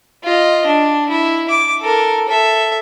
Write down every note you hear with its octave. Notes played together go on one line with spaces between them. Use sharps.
F4 D#5
D4
E4
D6
A4 A#4
A4 E5